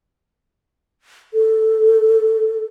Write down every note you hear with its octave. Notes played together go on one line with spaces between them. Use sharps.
A4